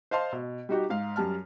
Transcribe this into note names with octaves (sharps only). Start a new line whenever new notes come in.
C5 D#5 F5 A5 C6
B2
G3 D#4 F#4 G4
G#2 F5
F#2 G3 A5 F6